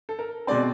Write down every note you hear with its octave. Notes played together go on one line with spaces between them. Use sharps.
A4
A#4
B2 G#3 C4 D5